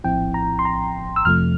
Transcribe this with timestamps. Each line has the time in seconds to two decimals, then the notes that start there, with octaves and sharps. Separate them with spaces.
0.04 A#1 A2 F3 C4 E4 G5
0.34 A#5
0.59 C6
0.65 A#5
1.16 E6
1.25 F2 C3 F3 A3 F6